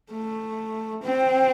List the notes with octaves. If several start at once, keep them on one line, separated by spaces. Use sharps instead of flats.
A3
C4